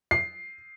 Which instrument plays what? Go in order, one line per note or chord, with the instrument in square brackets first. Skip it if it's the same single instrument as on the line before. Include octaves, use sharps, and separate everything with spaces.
[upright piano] C7